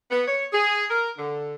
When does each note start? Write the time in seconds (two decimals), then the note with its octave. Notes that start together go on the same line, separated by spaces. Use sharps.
0.10 B3
0.27 C#5
0.52 G#4
0.89 A#4
1.17 D3